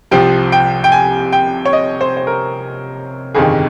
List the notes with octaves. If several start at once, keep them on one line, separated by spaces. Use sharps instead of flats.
C2 C3 F3 G5
G5
G5
G#5
G5
C#5
D#5
C5
C5
A#4
G1 F2 C3 D#3 G#4